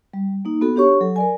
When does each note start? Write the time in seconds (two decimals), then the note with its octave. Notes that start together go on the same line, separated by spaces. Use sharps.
0.13 G3
0.45 A#3 D#4
0.61 B3 F#4 A4
0.76 D4 G4 C#5 C#6
1.01 F#3 A4
1.16 A#4 D5 G#5